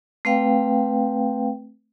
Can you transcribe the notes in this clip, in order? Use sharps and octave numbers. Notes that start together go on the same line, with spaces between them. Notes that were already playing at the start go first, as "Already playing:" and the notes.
A3 C4 B4 F5 G5